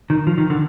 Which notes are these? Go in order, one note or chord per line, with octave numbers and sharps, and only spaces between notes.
D#3
F3
D#3
D3